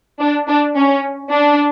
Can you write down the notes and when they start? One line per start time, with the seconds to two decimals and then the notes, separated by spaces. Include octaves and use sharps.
0.19 D4
0.47 D4
0.76 C#4
1.31 D4